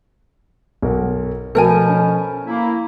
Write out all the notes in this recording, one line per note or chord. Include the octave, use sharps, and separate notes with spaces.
B1 A#4 F#5
B2 F3 A3 A4 A#4 G#5
C#4
A#3 E4